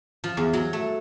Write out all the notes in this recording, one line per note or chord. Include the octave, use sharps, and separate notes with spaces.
F3
E2
F#3
A3